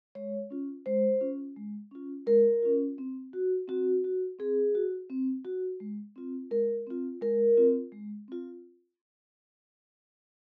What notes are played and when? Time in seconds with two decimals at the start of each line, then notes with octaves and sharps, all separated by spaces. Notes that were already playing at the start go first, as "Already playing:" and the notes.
0.15 G#3 C#5
0.50 C#4 F4
0.86 G#3 C5
1.21 C#4 F4
1.56 G#3
1.91 C#4 F4
2.27 G#3 A#4
2.63 C#4 F4
2.98 C4
3.33 F#4
3.68 C4 F#4
4.04 F#4
4.39 C4 G#4
4.75 F#4
5.10 C4
5.45 F#4
5.80 G#3
6.16 C4 F4
6.51 G#3 A#4
6.87 C4 F4
7.22 G#3 A#4
7.57 C4 F4
7.92 G#3
8.28 C4 F4